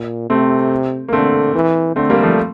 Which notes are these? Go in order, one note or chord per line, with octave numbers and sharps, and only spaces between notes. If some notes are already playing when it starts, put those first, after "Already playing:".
Already playing: A#2
C3 A3 C4
A#3
D3 A3 C4
E3
D3 A3 C4
G3 A#3
F3 A3